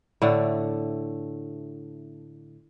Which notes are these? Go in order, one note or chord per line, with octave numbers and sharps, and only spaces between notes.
A2 D3 A3